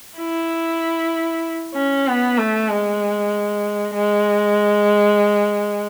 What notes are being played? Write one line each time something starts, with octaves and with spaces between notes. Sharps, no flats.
E4
C#4
B3
A3
G#3
G#3